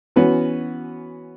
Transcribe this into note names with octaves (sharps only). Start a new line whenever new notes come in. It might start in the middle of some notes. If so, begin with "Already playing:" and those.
E3 B3 C#4 F#4